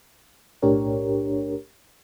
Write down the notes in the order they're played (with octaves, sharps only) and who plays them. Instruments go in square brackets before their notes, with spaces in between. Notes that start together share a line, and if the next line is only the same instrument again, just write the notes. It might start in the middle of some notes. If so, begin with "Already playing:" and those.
[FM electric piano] B1 A2 D4 G4 A#4 C#5